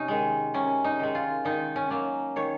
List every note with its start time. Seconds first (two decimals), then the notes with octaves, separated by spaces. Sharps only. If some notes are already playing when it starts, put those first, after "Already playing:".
Already playing: C3 C#4 D#4
0.08 D#3 G#3
0.54 C3 C#4
0.84 D#4
0.99 D#3 G#3
1.15 F4
1.45 D#3 D#4
1.76 C#4
1.90 F#3 A#3 C#4
2.36 D#3 C#5